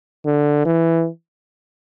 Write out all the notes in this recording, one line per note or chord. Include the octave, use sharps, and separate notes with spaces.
D3
E3